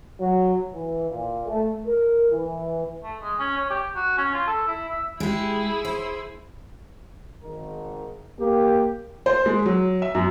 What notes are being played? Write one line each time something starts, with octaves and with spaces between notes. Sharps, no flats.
F#3
E3
A#2
A3
A#4
E3
A3
G#3
C#4
C#5
G4
F#4
C#4
F4
A4
E4
E5
G#3 E4 G4 G#4
C5
G#1 D#3 A#4
A#3 G4
C5
G#3
F#3
E5
F#2